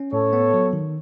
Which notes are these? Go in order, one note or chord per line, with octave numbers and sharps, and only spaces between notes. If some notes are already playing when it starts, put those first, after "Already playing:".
Already playing: C#4
A2 A4 C#5
B3
F#3
D#3